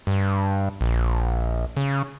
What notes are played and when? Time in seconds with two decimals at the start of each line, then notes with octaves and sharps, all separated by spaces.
0.07 G2
0.81 A#1
1.77 C#3